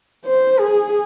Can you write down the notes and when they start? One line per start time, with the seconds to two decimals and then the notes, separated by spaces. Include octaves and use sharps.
0.26 C5
0.59 G#4